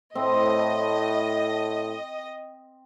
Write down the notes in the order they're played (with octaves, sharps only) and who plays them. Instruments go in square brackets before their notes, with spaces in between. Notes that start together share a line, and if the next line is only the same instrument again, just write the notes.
[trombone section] A2 [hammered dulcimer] C4 [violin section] D#5